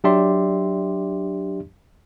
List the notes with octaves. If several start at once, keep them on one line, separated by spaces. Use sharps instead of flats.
F#3 D4 G4 D5 E5 C6